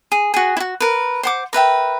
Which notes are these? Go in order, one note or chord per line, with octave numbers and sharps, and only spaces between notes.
G#4
F#4 G#4
E4 F#4
A#4 B4
C5 F#5 D6
A#4 B4 E5 G5